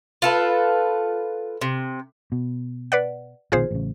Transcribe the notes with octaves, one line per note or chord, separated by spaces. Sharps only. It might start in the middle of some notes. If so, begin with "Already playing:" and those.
F4 A4 B4
C3
B2
B4 D5 F#5
A#1 B2 D#3 F4 G#4 C5
A1 C#3